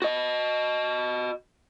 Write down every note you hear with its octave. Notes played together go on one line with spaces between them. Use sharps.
F#4 D#5